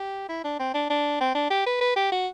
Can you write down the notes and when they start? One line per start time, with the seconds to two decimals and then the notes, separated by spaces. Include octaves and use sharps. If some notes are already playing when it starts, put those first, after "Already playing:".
Already playing: G4
0.29 E4
0.44 D4
0.59 C4
0.74 D4
0.90 D4
1.20 C4
1.35 D4
1.50 G4
1.66 B4
1.81 B4
1.96 G4
2.12 F#4